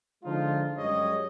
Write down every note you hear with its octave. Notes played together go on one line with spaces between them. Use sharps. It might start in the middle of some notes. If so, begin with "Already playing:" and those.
D3 F3 G#3 D#4 F4
F#2 G3 G#3 G4 C#5 D#5